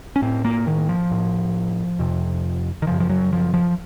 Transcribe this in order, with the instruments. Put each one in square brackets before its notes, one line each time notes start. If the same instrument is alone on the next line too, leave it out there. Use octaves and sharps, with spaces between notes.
[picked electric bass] C#4
A2 C4
A#3
D#3
F3
A2
F2 C3
D#3
F#2 C#3 F3
F3
F#3
F3
F3